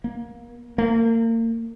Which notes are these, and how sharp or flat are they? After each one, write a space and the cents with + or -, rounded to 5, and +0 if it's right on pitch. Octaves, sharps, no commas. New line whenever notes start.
A#3 +25
A#3 -35